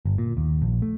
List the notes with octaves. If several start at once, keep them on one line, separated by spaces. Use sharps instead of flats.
G1
A#2
D#2
A#1
A3